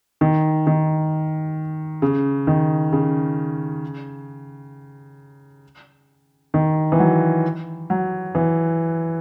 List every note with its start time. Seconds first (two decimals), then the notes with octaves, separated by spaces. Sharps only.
0.21 D#3
0.67 D#3
2.02 C#3
2.47 D#3
2.93 C#3
6.54 D#3
6.92 E3
6.99 F#3
7.90 F#3
8.35 E3